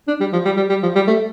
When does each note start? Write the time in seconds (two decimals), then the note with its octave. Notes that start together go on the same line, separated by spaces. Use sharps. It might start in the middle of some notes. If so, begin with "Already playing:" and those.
0.08 D4
0.20 G3
0.33 F3
0.45 G3
0.57 G3
0.70 G3
0.83 F3
0.95 G3
1.07 A3